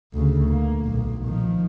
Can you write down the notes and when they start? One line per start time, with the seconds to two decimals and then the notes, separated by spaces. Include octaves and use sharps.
0.14 D2 C#3
0.50 A#3
0.84 B1 A#2
1.25 D#3 F3